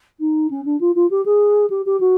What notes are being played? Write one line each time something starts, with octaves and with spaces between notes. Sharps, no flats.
D#4
C#4
D4
F4
F4
G4
G#4
G4
G4
F#4